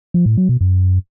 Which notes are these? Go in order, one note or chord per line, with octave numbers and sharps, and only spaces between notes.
F3
A2
F#3
B2
F#2